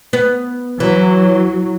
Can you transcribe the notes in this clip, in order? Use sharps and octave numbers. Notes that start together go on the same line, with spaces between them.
B3
E3 F#3